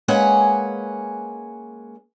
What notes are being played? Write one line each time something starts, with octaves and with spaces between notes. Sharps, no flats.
G#3 A#3 C#4 B4 F#5 G#5